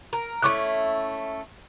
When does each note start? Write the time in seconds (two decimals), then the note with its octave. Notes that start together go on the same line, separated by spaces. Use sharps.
0.13 A#4
0.43 A3 C#4 E4 C#6 D6 F#6